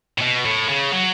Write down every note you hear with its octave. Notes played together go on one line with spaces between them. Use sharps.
A2
B2
A2
C#3
F#3